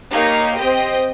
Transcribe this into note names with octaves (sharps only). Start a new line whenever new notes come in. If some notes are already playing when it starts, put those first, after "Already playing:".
A#3 D#4 G4 C#5
C4 G4 C5 D#5 G5